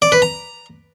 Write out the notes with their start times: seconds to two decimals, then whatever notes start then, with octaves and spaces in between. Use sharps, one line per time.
0.02 D5
0.12 B4
0.22 A#5